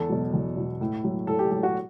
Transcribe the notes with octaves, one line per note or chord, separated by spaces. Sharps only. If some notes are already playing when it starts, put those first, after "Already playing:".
Already playing: E2 A4
B2 F#3
E2
B2 F#3
A2
F#3
A2 A4
G4
F#3 G4
F#4